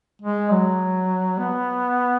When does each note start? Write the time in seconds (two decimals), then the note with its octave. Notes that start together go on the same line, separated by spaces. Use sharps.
0.22 G#3
0.51 F#3
1.39 B3